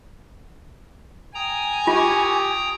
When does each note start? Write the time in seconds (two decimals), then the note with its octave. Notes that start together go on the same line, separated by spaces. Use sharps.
1.35 G5 G#5 A#5 D#6
1.87 F4 G4 C#6